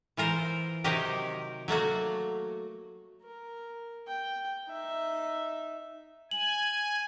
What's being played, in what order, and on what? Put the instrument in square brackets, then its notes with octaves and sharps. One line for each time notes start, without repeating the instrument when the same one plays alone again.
[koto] E3 F4 A#4 C5
C3 D#3 F#3 D#4 G4 A#4
F#3 A3 A#3 F#4
[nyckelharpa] A#4
G5
D#4 E5
[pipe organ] G#5 [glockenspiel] F#7